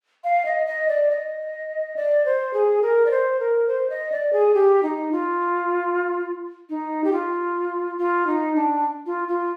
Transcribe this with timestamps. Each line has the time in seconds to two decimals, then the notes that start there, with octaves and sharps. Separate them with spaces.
0.24 F5
0.45 D#5
0.67 D#5
0.88 D5
1.10 D#5
1.96 D5
2.25 C5
2.53 G#4
2.82 A#4
3.06 D5
3.11 C5
3.40 A#4
3.68 C5
3.90 D#5
4.12 D5
4.33 G#4
4.54 G4
4.83 D#4
5.12 F4
6.69 D#4
7.04 G4
7.13 F4
7.98 F4
8.27 D#4
8.56 D4
9.06 F4
9.28 F4